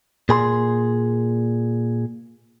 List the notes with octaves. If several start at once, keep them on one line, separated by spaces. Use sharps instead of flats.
A#2 G#4 B5 C6